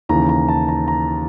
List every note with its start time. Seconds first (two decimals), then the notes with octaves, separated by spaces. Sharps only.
0.09 D#2 C#3 E3 A#5
0.29 A#5
0.48 A5
0.68 A#5
0.88 A#5